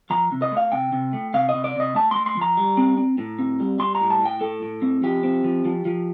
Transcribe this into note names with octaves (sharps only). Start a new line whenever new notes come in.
F3 A#5
C3
D#5
A3 F5
C3 G5
C3
A3
C3 F5
C3 D#5
D5
C3 D#5
A3 A5
A3 C6
C6
F3 A#5
G3
C4
C4
A2
C4
G3
G3 C6
A#5
A2
A5
A2 G5
A2 A4
A2
C4
F3 G4
C4
F3
F3
F3